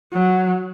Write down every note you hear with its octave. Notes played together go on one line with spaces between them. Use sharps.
F#3